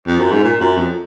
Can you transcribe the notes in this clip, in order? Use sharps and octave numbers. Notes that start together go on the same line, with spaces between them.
F2
F#2
G#2
A#2
F#2
F2